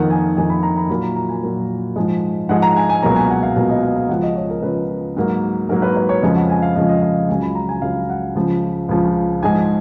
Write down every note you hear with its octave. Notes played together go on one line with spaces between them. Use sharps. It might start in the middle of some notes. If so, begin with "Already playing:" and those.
Already playing: F2 D#3 A#3 F#5
G#5
F2 D#3 A#3 G#5
B5
A#5
B5
A#2 F#3 A#3 B5
A#5
A#5
G#5
A#2 F#3 A#3
G#2 F3 G#3
G#2 F3 G#3 F#5
A#5
G#5
G#5
C#2 B2 F#3 A#3 A#5
G#5
F#5
F5
C#2 B2 F#3 A#3 F5
D#5
F5
F5
C#2 C#3 F3 F#5
D#5
C#5
A#4
C#2 C#3 F3 B4
G#2 F#3 A#3
G#2 F#3 A#3 A#4
B4
B4
C#5
F2 C#3 F3 G#3
F#5
G#5
F5
F2 C#3 F3 G#3 D#5
D#5
F5
C#2 C#3 F#3 G#5
B5
A#5
G#5
C#2 C#3 F#3 F5
F#5
C#2 C#3 F3
C#2 C#3 F3
G#2 F3 G#3 G#5